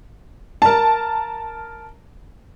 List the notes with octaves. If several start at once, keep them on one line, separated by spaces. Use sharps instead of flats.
A#4 A5